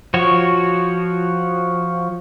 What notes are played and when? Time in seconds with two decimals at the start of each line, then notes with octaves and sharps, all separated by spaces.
0.14 F3 F#4 C#5